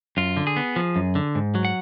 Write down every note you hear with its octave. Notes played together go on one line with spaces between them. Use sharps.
F#2 F4
D3
G#4
B3
F3
F#2
D3
G#2
F#3
F#5